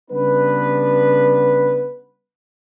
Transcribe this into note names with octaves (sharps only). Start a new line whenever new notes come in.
C#3 G3 B3 D4 B4